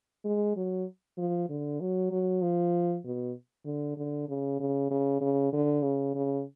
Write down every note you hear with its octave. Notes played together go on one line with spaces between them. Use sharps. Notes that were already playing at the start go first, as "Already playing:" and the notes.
G#3
F#3
F3
D3
F#3
F#3
F3
B2
D3
D3
C#3
C#3
C#3
C#3
D3
C#3
C#3